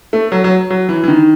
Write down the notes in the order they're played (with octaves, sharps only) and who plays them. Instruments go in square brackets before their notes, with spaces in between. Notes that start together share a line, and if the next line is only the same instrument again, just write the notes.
[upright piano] A3
F#3
F#3
F#3
E3
E3
D#3